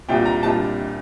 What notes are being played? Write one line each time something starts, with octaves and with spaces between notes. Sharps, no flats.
C2 A#2 G3 D4 F4 G5
A#5
C2 A#2 G3 D4 F4 A5